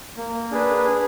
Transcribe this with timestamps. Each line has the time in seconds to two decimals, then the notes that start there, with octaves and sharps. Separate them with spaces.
0.17 A#3
0.51 D4 G#4 B4
0.85 G#4